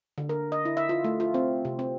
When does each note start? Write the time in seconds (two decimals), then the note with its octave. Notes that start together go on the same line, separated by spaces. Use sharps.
0.18 D3
0.29 A#4
0.52 D#5
0.65 E4
0.77 E5
0.89 F4
1.04 A3
1.20 F4
1.34 C4
1.65 C3
1.79 C4